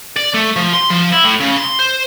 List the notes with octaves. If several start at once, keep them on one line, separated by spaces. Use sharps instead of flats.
D5
A3
F3
C6
F3
E4
A2
C#3
C6
C5